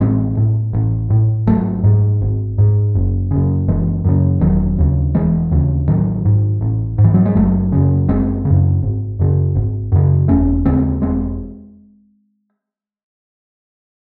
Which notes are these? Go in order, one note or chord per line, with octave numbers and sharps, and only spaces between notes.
A1 G#3 C4
A2
A1
A2
G#1 F#3 A3
G#2
G#1
G#2
F#1
F#2 C#3
F#1 E3 G#3
F#2 C#3
E1 D#3 F#3
D#2 C#3
E1 E3 G#3
D#2 C#3
A1 D#3 F#3
G#2
A1
G#2
E3
F#3
G#3
F#1 F#3 A3
F#2 C#3
F#1 G#3 C4
C#3
F#2
G#1
F#2 C#3
G#1
F#2 C#3
E1 A3 C#4
D#2 C#3 G#3 C4
E1 G#3 C4